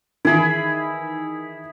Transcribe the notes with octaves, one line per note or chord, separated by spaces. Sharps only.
D#3 E3 E4 G#4 B5